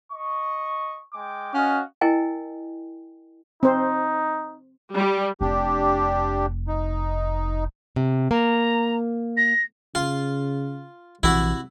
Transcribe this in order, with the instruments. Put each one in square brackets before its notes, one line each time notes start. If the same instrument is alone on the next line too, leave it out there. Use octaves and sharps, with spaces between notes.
[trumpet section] D#5 C#6
G#3 G5 D6
[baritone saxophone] C#4 [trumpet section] F#4 D#5 F5
[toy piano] E4 A#4 D#5 G5 G#5
[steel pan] C4 C5 [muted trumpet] D#4
[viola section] G3
[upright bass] F1 [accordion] D4 G4
[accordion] D#4
[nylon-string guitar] C3
[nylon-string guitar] A#3 [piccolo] A#5
[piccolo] A#6
[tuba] C#3 [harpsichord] F4
[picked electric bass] A#1 E3 [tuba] C3 [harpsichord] E4 F#4